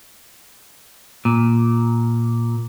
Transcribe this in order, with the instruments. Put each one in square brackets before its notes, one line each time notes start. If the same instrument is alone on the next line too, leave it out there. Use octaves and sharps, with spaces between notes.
[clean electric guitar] A#2